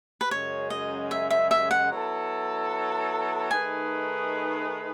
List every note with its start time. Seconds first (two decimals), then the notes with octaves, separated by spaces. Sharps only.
0.21 B4
0.30 F#2 C#3 G#3 C#5
0.70 D#5
1.11 E5
1.30 E5
1.51 E5
1.71 F#5
1.91 F#3 B3 E4 A4
3.51 D#3 A3 D#4 G#4 B4 G#5